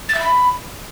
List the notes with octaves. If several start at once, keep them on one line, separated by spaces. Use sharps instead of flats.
A6
E5
B5